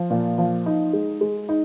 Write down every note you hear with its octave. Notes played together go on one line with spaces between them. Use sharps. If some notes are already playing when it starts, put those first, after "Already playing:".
Already playing: F3
A#2
F3
D#4
G#3
G#3
D#4